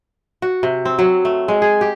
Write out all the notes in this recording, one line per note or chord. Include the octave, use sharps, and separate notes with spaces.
F#4
C3
C4
F#3
A3
G#3
G#4
G4